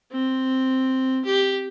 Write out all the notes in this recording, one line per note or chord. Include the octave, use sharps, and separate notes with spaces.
C4
G4